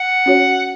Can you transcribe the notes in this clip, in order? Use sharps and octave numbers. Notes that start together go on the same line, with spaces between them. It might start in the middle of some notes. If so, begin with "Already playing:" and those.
Already playing: F#5
C#4 F#4 C#5